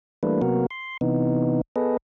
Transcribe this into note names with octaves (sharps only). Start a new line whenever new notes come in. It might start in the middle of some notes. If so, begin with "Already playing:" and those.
E3 G3 A3 A#3 D4 B4
C3 F#3 A#3 B3 F#4 A#4
C6
C3 E3 B3 D#4
B3 G#4 A4 B4 D#5